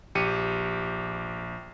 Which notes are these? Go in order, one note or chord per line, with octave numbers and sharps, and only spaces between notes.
A#1 G4 C#7 D#7